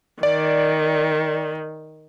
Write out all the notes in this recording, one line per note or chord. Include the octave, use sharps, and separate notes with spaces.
D#3 D5